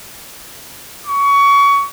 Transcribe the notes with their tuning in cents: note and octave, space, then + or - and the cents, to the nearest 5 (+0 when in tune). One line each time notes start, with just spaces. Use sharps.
C#6 +25